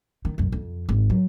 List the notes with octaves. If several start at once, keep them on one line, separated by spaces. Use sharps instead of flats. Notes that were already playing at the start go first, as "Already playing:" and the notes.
D#3
B1 F#2
F2
G#1
F#3